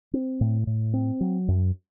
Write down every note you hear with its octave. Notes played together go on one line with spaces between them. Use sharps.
C4
A2
A2
C4
F#3
F#2